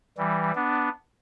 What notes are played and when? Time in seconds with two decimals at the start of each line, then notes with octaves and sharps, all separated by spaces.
0.18 E3 G3
0.55 B3 D4